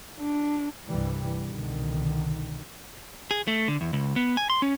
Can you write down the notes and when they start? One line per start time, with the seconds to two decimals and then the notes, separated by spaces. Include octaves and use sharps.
0.18 D4
0.86 C2 G2 E3 G3
1.46 C2 B2 D3 D#3
3.31 G#4
3.48 A3
3.68 D3
3.81 E2
3.93 C#2
4.16 B3
4.37 G#5
4.50 C6
4.62 C#4